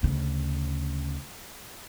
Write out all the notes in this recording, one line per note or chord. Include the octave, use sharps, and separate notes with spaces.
D2 C#3